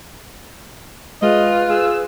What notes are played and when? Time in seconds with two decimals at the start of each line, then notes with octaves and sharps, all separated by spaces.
1.22 G#3 F4 B4 D#5
1.70 G#4 E6